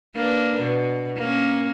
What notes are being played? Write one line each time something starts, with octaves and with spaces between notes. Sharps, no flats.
A#3 D4 B4
B2
A#3 C#4